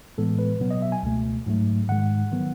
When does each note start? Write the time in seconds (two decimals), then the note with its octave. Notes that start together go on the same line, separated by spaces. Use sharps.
0.18 A2 E3 G#3 B3 A4
0.39 B4
0.60 B2 F#3 B3
0.71 D#5
0.82 E5
0.92 G#5
1.03 C#2 B2 A3
1.46 G#2 F#3 A3
1.89 G#2 D#3 G#3 F#5
2.32 D#3 F#3 B3